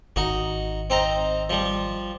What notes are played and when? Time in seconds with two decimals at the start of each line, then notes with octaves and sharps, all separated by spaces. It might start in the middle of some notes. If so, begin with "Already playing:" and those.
0.16 G#1 D#4 F#4
0.90 C4 D#4 A#5
1.50 F3 G3